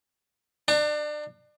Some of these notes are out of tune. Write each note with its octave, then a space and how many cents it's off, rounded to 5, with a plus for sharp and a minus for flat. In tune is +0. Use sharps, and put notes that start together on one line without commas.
D4 +30 A#5 -45